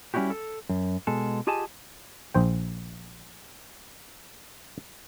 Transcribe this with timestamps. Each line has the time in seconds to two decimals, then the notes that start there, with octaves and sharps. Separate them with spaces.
0.14 G3 C#4 D4 E4 F#4 G4
0.30 A4
0.69 F#2
1.07 B2 G#3 G#4 A4
1.47 F4 G4 G#4 D#5 G#5 A5
2.34 A#1 C5 G5